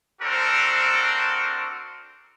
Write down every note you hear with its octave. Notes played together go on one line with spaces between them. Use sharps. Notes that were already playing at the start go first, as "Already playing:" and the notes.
C4 D4 F#4 A4 A#4 C5